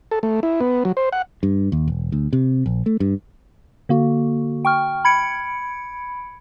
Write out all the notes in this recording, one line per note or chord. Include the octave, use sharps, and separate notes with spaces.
A4
A3
E4
B3
F#3
C5
F#5
G2
D#2
E1
D2
C3
A#1
A3
G2
D3 A#3 F#4
G5 C#6 F6
B5 G#6 C#7 D7